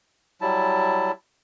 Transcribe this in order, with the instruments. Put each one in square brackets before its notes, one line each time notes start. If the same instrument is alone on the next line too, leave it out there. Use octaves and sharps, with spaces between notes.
[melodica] F#3 G3 E4 A5